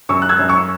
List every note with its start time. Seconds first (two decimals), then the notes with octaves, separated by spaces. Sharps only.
0.09 F#2 C#6 E6
0.22 F#6
0.29 E6 G#6
0.39 F#2
0.49 C#6 E6